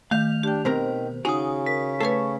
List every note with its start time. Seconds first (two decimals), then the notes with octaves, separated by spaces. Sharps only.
0.11 D#3 A3 F5 G6 F7
0.43 D4 G4 G5
0.65 B2 D#3 C4 A#4 C5
1.25 C#3 C#4 D#4 F#4 G#4 G#5 D#6
1.66 A#4 B6
2.00 A3 A4 B4 C#5